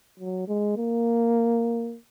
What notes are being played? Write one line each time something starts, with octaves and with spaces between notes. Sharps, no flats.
F#3
G#3
A#3